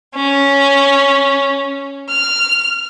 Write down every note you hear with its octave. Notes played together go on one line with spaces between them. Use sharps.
C#4
F6